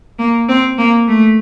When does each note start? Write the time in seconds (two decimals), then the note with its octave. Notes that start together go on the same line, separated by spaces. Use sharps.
0.19 A#3
0.49 C4
0.78 A#3
1.08 A3